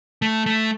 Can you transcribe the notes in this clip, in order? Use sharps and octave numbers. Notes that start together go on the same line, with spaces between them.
A3
A3